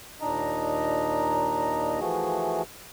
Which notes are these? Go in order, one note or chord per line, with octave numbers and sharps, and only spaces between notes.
D#2 A#2 D4 D#4 D#5 A#5
E3 F3 A3 F#4 G#4